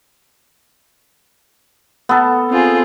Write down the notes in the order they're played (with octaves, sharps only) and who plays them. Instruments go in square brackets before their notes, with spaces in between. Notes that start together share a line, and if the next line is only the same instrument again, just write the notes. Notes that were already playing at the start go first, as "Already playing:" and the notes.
[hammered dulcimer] B3 A4
[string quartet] C4 F4 G#4